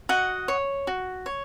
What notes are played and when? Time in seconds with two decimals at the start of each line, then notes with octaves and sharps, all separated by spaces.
0.09 F#4 D#5 F#5
0.48 C#5
0.87 F#4
1.26 C#5